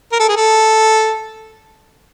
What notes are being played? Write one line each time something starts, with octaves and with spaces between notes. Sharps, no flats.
A#4
A4
G#4
A4